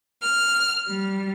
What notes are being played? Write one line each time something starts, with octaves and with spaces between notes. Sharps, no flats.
F6
G3